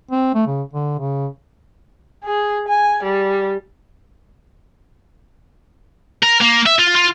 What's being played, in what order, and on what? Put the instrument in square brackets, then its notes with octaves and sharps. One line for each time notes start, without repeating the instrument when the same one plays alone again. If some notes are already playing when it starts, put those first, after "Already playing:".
[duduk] C4
A3
C#3
D3
C#3
[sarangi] G#4
G#5
G3
[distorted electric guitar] A#4
A#3
E5
F4
F4